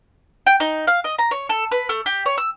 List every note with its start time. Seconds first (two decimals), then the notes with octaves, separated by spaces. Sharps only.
0.46 G5
0.60 D#4
0.87 F5
1.04 D#5
1.18 A#5
1.31 C#5
1.49 A4
1.71 B4
1.89 A3
2.06 G4
2.26 C#5
2.38 E6